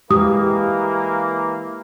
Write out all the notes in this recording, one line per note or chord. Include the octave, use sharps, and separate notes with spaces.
E3 G#3 A#3 G4 D#6